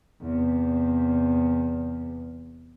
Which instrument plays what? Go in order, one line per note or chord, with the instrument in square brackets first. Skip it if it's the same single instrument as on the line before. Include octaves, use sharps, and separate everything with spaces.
[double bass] E2 C3